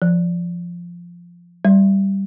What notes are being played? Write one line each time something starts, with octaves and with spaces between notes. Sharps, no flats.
F3
G3